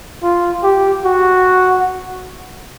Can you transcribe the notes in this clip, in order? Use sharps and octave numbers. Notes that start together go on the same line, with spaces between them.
F4
G4
F#4